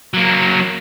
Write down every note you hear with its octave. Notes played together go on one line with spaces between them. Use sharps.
F#3 A#3